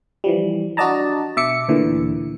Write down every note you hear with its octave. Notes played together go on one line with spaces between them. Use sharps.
E3 F3 G3
D4 F#4 D5 D#5 A5 A#5
B2 E5 D6 C#7
D2 A#2 D3 E3